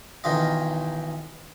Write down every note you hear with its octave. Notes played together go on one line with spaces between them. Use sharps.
B1 D#3 E3 F4 D#5